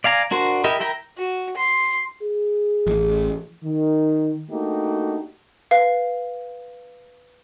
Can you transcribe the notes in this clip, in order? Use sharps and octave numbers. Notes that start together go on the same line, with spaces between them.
D5 F5 G#5 A#5
D4 F#4 A#4 C5
E4 G4 A#4 D#5
E4 A#4 G5 A#5
F#4
C6
G#4
A1
D#3
A3 A#3 D4 D#4 F#4 G4
B4 F5